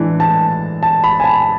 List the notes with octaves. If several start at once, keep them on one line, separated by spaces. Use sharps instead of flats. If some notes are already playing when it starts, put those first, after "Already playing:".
Already playing: A2 E3 G#3 D4
A5
A5
B5
G#5
A5